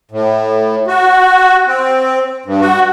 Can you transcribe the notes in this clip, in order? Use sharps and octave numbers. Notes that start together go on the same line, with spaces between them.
A2
F#4
C4
G2
F#4